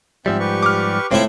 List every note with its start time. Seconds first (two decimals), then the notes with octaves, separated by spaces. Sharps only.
0.26 G#2 F3 G3 C4 E5
0.40 G4 B4 C#6
0.63 D6 F6
1.11 A2 A3 C4 E4 F4 C#5